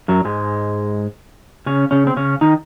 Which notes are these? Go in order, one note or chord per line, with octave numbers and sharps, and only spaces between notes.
F#2 F#3
G#2 G#3
C#3 C#4
C#3 C#4
C4
C#3 C#4
D#3 D#4